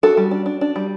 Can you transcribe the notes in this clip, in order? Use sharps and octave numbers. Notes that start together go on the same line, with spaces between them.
D4 F#4 A4
G3
D4
D4
D4
G3